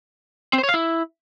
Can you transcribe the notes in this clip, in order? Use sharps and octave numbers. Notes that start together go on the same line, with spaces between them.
C4
C5
C#5
F5
E4